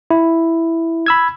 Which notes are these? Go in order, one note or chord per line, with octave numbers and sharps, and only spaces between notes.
E4
B5 E6 G#6